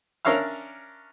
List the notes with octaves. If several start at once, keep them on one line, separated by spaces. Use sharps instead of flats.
C#4 D4 A#4 C#5 E5 F5